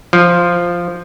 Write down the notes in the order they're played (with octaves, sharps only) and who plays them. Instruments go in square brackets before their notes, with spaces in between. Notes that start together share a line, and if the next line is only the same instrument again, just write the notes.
[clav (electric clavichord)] F3